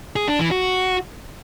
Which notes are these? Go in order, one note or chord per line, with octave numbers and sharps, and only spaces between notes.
G#4
D4
E3
F#4